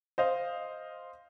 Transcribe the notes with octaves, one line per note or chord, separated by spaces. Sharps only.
C5 D#5 F5